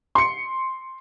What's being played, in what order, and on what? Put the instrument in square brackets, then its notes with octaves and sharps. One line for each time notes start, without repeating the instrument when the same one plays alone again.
[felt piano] C6 C#7